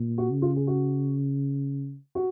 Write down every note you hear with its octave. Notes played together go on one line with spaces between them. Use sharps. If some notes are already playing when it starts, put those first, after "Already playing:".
Already playing: A#2
F#4
C#3
F4
G#4
F#4
F#4